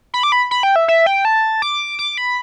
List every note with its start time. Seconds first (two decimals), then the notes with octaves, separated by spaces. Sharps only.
0.14 B5
0.23 D6
0.32 B5
0.51 B5
0.63 G5
0.76 E5
0.88 E5
1.06 G5
1.25 A5
1.62 D6
1.99 D6
2.18 B5